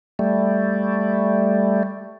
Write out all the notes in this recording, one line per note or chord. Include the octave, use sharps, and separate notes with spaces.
G3 A3